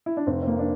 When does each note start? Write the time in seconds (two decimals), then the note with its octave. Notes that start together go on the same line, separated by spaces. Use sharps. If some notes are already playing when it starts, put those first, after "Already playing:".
0.06 E4
0.17 D4
0.27 F1 C4
0.42 C4
0.47 A#3
0.59 D4